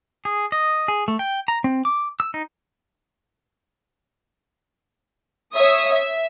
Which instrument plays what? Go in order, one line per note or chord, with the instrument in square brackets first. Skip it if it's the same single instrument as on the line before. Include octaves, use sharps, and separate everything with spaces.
[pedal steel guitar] G#4
D#5
G#4
A3
G5
A#5
C4
D6
E6
D#4
[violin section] C#5 E5 D#6
E5